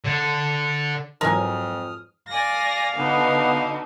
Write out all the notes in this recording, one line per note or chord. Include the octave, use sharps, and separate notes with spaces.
D3
F2 G#2 E3 F#3 A#4 G#5 D#6 F6
D5 F5 G#5 A#6
B2 D3 B3 D#4